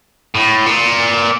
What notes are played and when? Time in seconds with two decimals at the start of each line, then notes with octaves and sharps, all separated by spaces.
0.35 A2
0.66 A#2